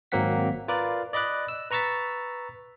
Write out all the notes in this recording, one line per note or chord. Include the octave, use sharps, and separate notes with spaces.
G#1 F#3 A#3 C4 F#5 B6
F4 A#4 B4 D5
D5 D#5 B5 D6 F#6
E6
B4 A#5 C#6 E6 A6 B6